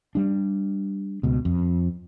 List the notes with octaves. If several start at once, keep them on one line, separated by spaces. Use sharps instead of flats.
G3 D4
C#2 B2
F2